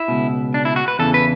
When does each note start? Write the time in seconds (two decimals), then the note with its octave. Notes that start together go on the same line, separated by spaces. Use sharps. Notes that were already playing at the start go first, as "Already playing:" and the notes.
Already playing: E4
0.08 C#2 B2
0.54 D4
0.65 E4
0.76 F#4
0.88 B4
0.99 E2 C#3 E3 A4
1.14 B4